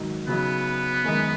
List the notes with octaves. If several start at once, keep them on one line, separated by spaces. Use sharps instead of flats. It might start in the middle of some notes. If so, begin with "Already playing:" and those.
Already playing: G#2 D#3 F#3 D#4
C#3 F#3 B3 D#4
F#2 D#3 G#3 D#4